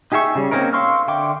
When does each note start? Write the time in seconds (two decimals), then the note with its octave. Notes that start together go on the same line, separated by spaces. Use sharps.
0.12 D#4 G4 G#4 E5 C#6
0.35 C#3 G3
0.51 A#3 C4 C#4 D#4 A#4
0.73 F5 C6 C#6 E6 F6
1.08 D3 E5 G5 C6 D6